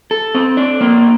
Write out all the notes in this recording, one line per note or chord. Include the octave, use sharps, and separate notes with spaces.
A4
C4
D4
A#3